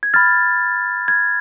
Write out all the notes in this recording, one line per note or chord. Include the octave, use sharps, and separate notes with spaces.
G#6
B5 F6 A6
G#6